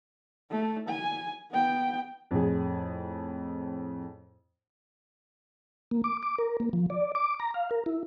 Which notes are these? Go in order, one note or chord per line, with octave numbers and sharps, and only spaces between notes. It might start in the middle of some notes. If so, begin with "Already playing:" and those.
A3
G#5
B3 G5
F2 A2 G#4
A#3
D6
D6
A#4
A#3
F3
D5
D6
A#5
F5
A#4
E4